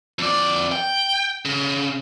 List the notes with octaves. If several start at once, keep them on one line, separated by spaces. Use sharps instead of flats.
F2 D5
G5
C#3